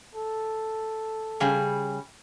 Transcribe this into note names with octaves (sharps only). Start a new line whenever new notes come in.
A4
C#3 G3 G#4